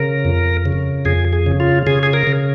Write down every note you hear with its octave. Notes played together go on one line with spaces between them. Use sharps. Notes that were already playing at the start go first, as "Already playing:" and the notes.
Already playing: C#3 A#4
F2
C#3
F2 G#4
G#4
C#3
F4
C#3 G#4
G#4
A#4
C#3